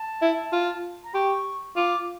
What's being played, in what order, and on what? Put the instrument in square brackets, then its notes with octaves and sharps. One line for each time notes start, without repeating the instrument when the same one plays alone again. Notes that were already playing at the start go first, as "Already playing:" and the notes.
Already playing: [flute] A5
[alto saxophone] E4
F4
[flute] A#5
[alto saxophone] G4 [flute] C#6
[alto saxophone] F4 [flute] D6